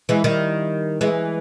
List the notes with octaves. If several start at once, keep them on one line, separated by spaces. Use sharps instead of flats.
E3 G#3
D#3 G3
E3 G#3